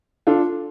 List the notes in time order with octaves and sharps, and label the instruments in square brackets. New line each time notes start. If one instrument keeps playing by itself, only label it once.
[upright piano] D4 F4 A4